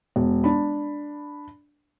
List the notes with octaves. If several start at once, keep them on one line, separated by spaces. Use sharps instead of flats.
E1
D4 B5